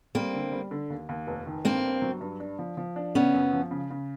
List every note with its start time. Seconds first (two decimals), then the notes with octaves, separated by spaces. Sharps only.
0.15 G3 A#3 C4
0.34 D3
0.52 G3
0.71 D3
0.90 D#2
1.09 D#2
1.27 F1
1.47 D#3
1.64 G2 A#3 C4
1.84 G2
2.02 F#3
2.21 G2
2.40 D4
2.59 F3
2.77 F3
2.96 D4
3.15 C#3 B3 C#4
3.34 F#2
3.53 F3
3.71 C#3
3.90 C#3